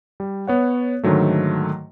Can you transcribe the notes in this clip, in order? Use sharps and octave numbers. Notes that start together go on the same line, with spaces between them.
G3
B3 C#5 F#5
G#2 D3 D#3 F#3 A3